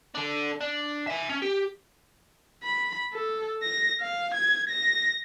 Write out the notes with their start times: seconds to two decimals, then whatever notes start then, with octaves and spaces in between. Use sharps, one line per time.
0.15 D4 A4
0.61 D4
1.07 E5 G#5
1.29 C#4
1.42 G4
2.63 B5
3.13 A4
3.63 A#6
4.01 F5
4.35 G#6
4.70 A#6